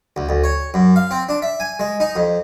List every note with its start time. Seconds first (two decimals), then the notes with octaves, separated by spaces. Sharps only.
0.16 D2
0.29 D2
0.44 C#5
0.74 F#2
0.96 F5
1.11 C4
1.29 D4
1.42 E5
1.60 G#5
1.80 G#3
2.00 D#4
2.16 F2